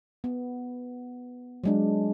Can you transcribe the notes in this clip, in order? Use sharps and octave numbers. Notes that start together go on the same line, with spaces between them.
B3
F#3 G#3 D4